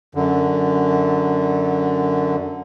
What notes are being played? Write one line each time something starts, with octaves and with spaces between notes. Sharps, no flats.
F#2 D3